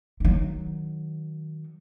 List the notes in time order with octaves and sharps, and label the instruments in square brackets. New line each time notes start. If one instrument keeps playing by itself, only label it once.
[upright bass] D#3 F#3